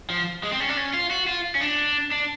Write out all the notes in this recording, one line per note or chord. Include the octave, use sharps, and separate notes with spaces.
F3
G#3
C4
C#4
D4
C#4
F4
F#4
F4
C#4
D4
D4